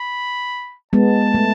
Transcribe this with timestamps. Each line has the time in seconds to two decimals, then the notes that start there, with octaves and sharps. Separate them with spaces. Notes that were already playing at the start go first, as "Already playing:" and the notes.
Already playing: B5
0.93 G#3 B3 A5
1.34 A3